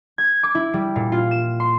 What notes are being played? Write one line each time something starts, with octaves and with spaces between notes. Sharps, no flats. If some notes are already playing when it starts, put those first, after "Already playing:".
G#6
D6
E4
G3
A#2
F4
E7
C6